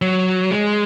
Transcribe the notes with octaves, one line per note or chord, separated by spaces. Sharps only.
F#3
G#3